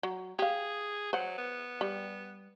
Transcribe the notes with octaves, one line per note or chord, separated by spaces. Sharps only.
F#3
G4 G#4 F5
F#3 C5 F#5
B3
G3